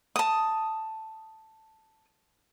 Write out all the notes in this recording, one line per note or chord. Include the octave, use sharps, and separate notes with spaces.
A5 D#6